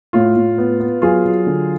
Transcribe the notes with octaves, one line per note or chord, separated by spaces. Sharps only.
A2 F4
A2
B3
B3
F#3 F4 G#4
F#3
D3